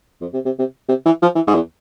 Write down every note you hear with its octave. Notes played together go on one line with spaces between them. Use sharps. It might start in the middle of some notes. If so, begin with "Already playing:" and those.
F2
C3
C3
C3
C3
E3
F3
E3
G#2
E2